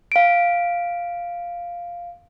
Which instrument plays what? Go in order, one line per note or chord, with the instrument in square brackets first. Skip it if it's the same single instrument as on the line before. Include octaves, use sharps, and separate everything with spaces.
[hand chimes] F5 D7